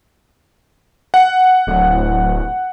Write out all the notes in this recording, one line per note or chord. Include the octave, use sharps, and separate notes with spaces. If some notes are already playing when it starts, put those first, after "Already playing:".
F#5
D1